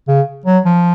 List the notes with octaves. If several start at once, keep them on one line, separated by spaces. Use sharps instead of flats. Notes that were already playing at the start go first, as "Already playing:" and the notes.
C#3
F#3
F3